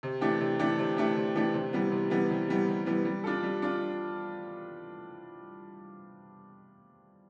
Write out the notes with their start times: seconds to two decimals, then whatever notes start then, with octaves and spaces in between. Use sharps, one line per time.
0.03 C3
0.21 E3 A3 D4 G4
0.40 C3
0.59 E3 A3 D4 G4
0.78 C3
0.97 E3 A3 D4 G4
1.16 C3
1.35 E3 A3 D4 G4
1.54 C3
1.73 E3 G3 B3
1.91 C3
2.10 E3 G3 B3
2.30 C3
2.48 E3 G3 B3
2.68 C3
2.86 E3 G3 B3
3.05 G3
3.24 D4 F4 A4
3.43 G3
3.62 D4 F4